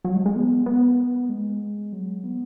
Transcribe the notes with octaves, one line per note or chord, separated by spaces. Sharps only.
F#3
G#3
G#3
B3
B3
G#3
F#3
B3